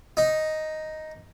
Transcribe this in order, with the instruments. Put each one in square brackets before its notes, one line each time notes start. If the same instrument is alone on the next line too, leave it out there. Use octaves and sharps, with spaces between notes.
[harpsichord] D#4